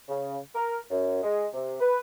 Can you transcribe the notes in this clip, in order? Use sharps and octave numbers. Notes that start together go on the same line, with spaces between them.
C#3
A#4
F#2
G#3
C3
B4